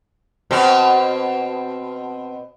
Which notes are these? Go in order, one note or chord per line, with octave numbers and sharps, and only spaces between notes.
B2 C4